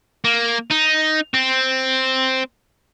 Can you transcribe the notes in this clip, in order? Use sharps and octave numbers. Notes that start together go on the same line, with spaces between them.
A#3
D#4
C4